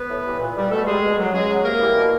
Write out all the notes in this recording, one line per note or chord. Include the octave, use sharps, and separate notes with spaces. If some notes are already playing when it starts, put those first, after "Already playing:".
Already playing: B3 B4
A2
E3 G3
A#2
G3
B2 A3 A4
G3 G#3 G#4
B2
F#3
C#3 G#3 G#4
F#3
C3 A#3 A#4
E3 G3
B2